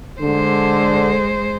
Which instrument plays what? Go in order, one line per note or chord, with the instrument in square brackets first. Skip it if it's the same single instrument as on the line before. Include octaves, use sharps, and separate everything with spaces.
[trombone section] D3 [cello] G#3 C5